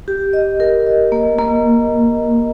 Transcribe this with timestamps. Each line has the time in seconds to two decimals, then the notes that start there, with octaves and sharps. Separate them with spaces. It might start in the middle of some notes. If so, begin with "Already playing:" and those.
0.08 G4
0.33 D#5
0.60 A#4
0.86 D#5
1.12 A#3
1.38 A#3